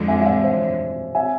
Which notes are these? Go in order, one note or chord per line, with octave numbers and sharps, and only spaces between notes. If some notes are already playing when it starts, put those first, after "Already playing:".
Already playing: F2 D3 G#3
E5 G#5
E5
D5 F5
C5 E5
E5 G#5